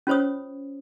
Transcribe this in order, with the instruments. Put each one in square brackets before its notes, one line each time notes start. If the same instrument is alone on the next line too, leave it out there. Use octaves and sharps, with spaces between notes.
[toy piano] C#4 F4 C5 C#5 D#6